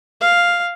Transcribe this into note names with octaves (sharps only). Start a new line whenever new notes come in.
F5